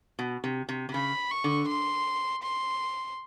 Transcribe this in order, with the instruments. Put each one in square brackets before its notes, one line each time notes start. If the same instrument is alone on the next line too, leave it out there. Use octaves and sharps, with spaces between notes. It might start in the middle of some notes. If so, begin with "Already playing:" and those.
[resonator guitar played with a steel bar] B2
C3
C3
C3
[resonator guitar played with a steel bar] C#3 [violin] B5
[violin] C#6
[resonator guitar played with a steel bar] D3
[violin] C6
C6